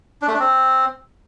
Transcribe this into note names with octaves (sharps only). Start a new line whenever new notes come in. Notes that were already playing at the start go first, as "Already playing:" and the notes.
D4
A3
D4
C4